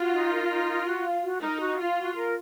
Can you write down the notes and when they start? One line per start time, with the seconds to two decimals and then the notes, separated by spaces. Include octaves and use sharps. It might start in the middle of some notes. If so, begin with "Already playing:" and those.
Already playing: F4 F#4
0.11 D#4
0.30 A#4
0.48 D#4
0.67 A#4
0.85 F#4
1.04 F5
1.22 F#4
1.40 D#4 A#4
1.59 F#4
1.78 F4 F5
1.96 F#4
2.14 A#4